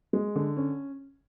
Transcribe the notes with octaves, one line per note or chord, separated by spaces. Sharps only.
G#3
D3
C#4